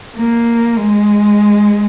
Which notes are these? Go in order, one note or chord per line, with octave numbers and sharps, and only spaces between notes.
A#3
G#3